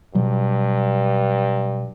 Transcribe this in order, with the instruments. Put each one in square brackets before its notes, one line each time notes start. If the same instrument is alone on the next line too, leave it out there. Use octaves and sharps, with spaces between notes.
[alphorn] G2 [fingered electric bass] B2 F#3 G3